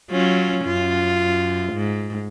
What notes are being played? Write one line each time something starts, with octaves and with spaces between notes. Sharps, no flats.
F#3 C#4 F4
F#2 F4
G#2